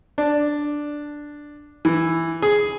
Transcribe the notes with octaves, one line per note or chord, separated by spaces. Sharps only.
D4
E3
G#4